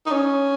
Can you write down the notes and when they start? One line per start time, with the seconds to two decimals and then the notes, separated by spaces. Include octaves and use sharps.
0.06 D#4
0.11 C#4